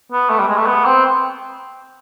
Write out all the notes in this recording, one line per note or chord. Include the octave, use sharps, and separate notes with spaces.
B3
A3
G3
G#3
A3
B3
C4